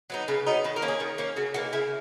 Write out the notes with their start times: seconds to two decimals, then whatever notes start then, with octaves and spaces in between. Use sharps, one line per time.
0.10 F#3 B3 D#4
0.28 C#3 B4
0.46 F#3 B3 D#4
0.64 D#3 B4
0.76 A#4
0.82 A#3 C#4
0.88 G#4
1.00 D#3
1.18 A#3 C#4
1.36 C#3 F#4
1.54 E3 A#3 D#4 F#4
1.73 C#3 E4